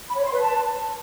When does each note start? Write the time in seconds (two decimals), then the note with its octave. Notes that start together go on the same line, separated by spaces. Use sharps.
0.08 B5
0.16 C#5
0.24 C6
0.32 B4
0.40 A5